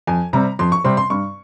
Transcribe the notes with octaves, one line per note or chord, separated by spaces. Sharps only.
F2 G#5
C3 G3 C4 A#5
F2 C6
C#6
C3 G3 C4 C6
C6
G2 C#6